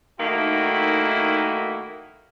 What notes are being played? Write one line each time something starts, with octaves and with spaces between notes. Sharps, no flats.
D#3 A3 A#3 D#4 E4 F#4